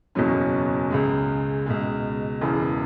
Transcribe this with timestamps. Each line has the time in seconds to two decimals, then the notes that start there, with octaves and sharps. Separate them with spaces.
0.15 F#1 E2 B2 F#3 C#4
0.90 C#2 C#3 G#3
1.66 C#2 B2 G#3
2.41 E1 E2 C#3 E3